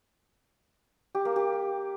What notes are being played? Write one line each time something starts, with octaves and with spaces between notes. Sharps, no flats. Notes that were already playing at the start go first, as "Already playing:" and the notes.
G4
A#3
G4